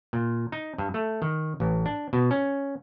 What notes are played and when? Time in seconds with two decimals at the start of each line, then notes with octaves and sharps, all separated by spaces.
0.13 A#2
0.52 D#4
0.78 G2
0.94 A3
1.22 D#3
1.60 A1
1.86 D4
2.13 B2
2.31 C#4